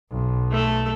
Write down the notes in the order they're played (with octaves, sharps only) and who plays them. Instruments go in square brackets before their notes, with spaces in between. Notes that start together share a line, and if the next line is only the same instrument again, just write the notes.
[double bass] B1
[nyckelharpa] A3 A4